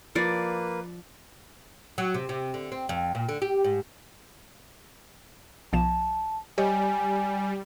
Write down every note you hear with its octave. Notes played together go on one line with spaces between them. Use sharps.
F3 A#3 B4 D5
F#3
C3
C3
D3
C4
F2
A#2
D3
G4
G#2
B1 F3 A5 E7
G3 G4 C#5 D#5 G#5